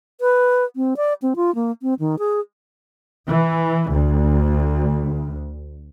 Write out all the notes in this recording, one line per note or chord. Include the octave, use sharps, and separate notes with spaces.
B4
C4
D5
C4
F4
A#3
C4
D#3
G#4
E3
D2